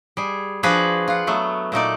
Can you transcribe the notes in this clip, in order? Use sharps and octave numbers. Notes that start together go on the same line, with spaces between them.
G3 G#4
F3 D4 F#4 G#4 B4 C5
F4 F#5
F#3 A3 B3
A#2 A3 D#4 D5